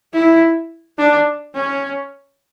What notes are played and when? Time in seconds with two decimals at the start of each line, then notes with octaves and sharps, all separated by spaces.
0.14 E4
0.98 D4
1.55 C#4